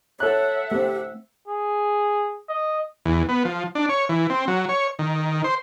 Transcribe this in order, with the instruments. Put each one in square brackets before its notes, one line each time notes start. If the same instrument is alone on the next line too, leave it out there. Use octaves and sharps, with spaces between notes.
[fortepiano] A4 F#6 [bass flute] C#5 [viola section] E5 F#5
[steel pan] A3 C4 [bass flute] G4
[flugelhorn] G#4
D#5
[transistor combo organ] E2
B3
F3
D4
C#5
E3
C4
F#3
C#5
D#3
C5